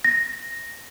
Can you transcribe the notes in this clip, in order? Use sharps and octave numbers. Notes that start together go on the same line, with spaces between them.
A#6